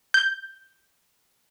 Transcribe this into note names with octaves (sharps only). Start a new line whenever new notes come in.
G6